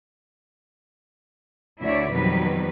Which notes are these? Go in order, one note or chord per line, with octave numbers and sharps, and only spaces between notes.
D2 D3 E4 C#5 D5 E5
F2 B2 D#3 F#3 G3 B4